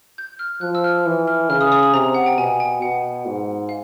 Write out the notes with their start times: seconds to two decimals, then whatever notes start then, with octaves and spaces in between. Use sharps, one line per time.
0.18 G6
0.39 F6
0.61 F3 F#6
0.75 E6
0.84 F6
1.06 E3
1.27 F6
1.50 C#3 F6
1.61 D#6
1.72 D#6
1.83 D#6
1.94 C3 A#5
2.14 F#5
2.26 G5
2.38 B2 G#5
2.60 G5
2.82 B2 F#5
3.26 G#2
3.69 F5